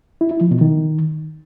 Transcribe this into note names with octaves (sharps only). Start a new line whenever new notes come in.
E4
E4
F3
B2
D#3